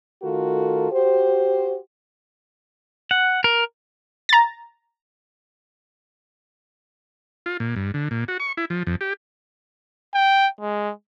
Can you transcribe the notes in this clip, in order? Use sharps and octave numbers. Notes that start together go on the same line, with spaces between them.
D#3 A3 F4 F#4 A4 A#4
F#4 G4 C5
F#5
A#4
A#5 A6
F4
A#2
G2
D3
A#2
F#4
C#6
E4
F3
F2
G4
G5
G#3